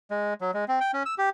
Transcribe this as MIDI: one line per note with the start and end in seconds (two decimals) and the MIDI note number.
0.11 0.34 56
0.41 0.51 54
0.54 0.65 56
0.68 0.80 60
0.81 0.91 79
0.93 1.03 61
1.06 1.15 88
1.18 1.29 67